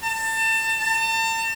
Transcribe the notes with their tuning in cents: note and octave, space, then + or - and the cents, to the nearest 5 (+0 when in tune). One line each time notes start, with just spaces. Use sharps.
A5 +30
A5 +40